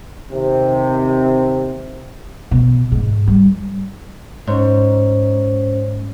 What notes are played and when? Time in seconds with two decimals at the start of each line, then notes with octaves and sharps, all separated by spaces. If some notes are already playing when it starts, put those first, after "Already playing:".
0.32 D#2 C3
2.51 B2
2.92 G#2
3.27 G3
4.47 G#2 C#4 C5 C#5